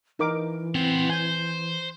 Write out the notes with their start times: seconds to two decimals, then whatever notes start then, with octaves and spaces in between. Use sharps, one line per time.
0.19 E3 D#4 A#4 D6
0.75 B3 C4 C5
1.10 C5 G#5 G6